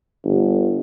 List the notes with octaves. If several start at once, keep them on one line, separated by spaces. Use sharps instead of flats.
G1